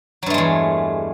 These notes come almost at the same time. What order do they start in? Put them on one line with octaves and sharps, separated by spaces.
F#3 G2 A3 G#3 E2